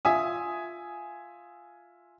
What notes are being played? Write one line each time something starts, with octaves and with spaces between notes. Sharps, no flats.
F4 E5 G#5 D#6